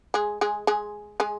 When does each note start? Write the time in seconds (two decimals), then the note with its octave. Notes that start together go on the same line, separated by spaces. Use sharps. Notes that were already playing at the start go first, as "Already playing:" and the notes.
0.14 G#3 G#4
0.41 G#3 G#4
0.67 G#3 G#4
1.20 G#3 G#4